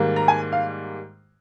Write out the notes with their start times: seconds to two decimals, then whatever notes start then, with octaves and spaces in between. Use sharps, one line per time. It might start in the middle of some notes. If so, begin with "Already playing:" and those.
Already playing: G#2 D#3 G3 A#3
0.16 A#5
0.28 G#5
0.52 F5